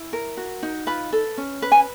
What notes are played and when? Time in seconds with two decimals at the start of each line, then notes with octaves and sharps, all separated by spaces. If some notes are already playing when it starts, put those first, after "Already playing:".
Already playing: E4
0.13 A#4
0.37 F#4
0.63 D#4
0.87 F4 B4 B5
1.13 A4
1.38 C#4
1.62 B4
1.72 G#5